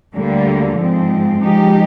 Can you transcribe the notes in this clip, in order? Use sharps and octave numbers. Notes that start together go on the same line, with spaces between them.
D2 D3 G3 A#3
G#2 F3 C4
F3 G#3 D#4 G4